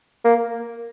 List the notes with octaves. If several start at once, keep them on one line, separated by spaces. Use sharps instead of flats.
A#3